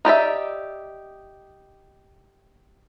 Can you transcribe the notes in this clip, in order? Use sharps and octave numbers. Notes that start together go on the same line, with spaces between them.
D#4 G4 D5 E5